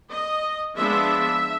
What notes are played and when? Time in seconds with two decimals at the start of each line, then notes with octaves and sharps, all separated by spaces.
0.10 D#5
0.76 F3 G#3 B3 D4 E5